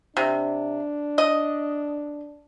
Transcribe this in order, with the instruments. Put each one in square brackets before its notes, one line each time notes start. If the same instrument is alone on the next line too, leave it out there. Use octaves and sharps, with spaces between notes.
[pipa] C3 [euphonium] D4
[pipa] D#5